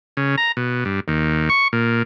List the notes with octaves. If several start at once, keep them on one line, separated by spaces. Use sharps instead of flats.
C#3
A#5
B2
G2
D#2
C#6
A#2